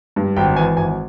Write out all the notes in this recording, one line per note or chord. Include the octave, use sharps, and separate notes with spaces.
G2
G#1 G5
E3 G#5
G#1 G#5